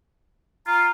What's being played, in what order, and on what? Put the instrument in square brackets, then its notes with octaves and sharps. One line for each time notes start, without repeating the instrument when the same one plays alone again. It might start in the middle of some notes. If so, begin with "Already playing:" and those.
[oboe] F4 [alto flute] A#5